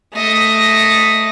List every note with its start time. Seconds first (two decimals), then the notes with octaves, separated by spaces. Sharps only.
0.15 A3 D#5